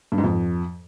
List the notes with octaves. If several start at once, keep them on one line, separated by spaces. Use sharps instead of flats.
G2
G#2
F2